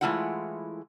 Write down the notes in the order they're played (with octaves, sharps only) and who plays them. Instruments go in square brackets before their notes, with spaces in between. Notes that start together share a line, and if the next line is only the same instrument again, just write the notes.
[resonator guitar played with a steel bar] E3 G#3 A3 E4 F4 F#5